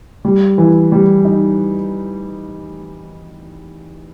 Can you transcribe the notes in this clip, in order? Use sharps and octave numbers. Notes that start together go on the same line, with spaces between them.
G3
E3
G3
D#4